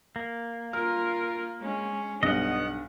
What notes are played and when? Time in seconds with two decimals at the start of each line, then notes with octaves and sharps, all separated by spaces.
0.16 A#3
0.73 F4 A#4 F6
1.61 G#3 C#4
2.23 B1 G2 B3 D#5 F#5